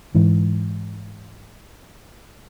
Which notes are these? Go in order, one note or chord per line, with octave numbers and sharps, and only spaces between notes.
G#2 E3